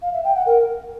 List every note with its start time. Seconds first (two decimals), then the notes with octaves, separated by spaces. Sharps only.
0.02 F5
0.13 E5
0.24 G5
0.35 F#5
0.46 A#4